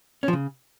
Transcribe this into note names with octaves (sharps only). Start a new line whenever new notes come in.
C#4
F3
C#3